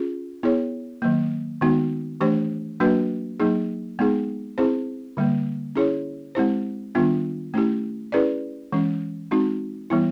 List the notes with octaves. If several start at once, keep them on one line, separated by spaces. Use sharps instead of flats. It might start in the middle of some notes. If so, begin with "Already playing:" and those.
Already playing: C#4 F4 G#4
B3 E4 G#4 C#5
D#3 F#3 A#3
D#3 G#3 B3 D#4 F#4
E3 A3 D4 G4 C5
F#3 A#3 D4 F#4 B4
F#3 A#3 D#4 G#4
G#3 B3 D#4 G#4
C4 E4 G#4 C5
D3 G3 A#3
C#4 E4 G#4 C#5
G#3 C4 E4 G4 C5
D#3 G3 B3 D4 F4
A3 C#4 E4 G4
C#4 E4 G#4 B4 D5
E3 G#3 C#4
G#3 C4 D#4 F#4
E3 G3 B3 E4